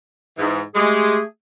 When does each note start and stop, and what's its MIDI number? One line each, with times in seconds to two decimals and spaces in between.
0.38 0.61 44
0.38 0.61 52
0.75 1.17 56
0.75 1.21 57
0.75 1.21 67
0.75 1.21 68